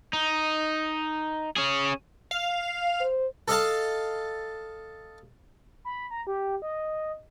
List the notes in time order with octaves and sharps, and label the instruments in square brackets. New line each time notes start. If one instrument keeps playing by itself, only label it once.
[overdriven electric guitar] D#4
C#4 G#4
[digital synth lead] F5
[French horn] C5
[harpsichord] A4 D#5 F5 A5
[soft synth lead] B5
A#5
G4
D#5